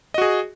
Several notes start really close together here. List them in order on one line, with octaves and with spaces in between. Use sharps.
D#5 F#4 G#4